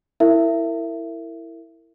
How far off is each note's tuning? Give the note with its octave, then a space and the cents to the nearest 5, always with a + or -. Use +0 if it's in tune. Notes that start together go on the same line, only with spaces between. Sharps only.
E4 +0 A#4 -30 E5 +20